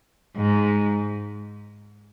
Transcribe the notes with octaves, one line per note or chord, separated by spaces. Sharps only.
G#2